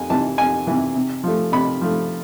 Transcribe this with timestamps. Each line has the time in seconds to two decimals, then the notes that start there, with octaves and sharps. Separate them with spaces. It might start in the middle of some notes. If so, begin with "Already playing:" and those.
Already playing: F2 G#5
0.10 C3 E3 A5
0.38 F2 G#5
0.67 C3 E3
0.95 C3
1.24 F3 A3
1.52 C3 B5
1.81 F3 A3